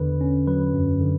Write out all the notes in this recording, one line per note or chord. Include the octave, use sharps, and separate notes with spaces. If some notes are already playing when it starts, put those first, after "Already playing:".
Already playing: E2 D3 B4
C#4
F#3 B4
F#2
D3